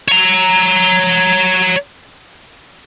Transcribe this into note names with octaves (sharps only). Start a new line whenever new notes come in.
C#5 A#5